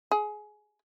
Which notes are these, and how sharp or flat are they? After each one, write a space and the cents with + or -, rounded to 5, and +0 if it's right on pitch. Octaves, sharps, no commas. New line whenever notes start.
G#4 +20